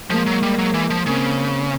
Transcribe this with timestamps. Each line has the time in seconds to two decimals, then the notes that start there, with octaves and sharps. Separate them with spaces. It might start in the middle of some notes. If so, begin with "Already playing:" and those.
0.10 F3 G#3 A#3
0.26 F#3
0.42 G3
0.58 F#3
0.74 E3
0.90 F3
1.06 C#3 A#3 C4